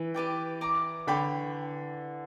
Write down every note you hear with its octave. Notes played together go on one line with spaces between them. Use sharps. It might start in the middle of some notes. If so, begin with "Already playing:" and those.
Already playing: E3
G4 B4 D5 G5
D5 A#5 D6
D3 G4 C#5 G5 B5